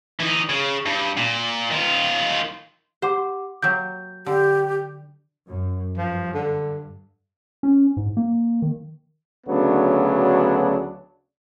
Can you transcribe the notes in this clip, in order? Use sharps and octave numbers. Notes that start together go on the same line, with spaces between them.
E3 D#4
C#3
G2
A#2
D#3 F4
G4 C5 F#5 D6
F#3 A#3 G4 G6
D3 G4
F#2
G2 F3
D3
C#4
G#2
A#3
D#3
D2 C#3 F#3 B3 D4